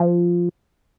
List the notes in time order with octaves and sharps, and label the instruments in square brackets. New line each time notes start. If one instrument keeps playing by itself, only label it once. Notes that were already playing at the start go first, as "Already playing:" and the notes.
Already playing: [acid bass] F3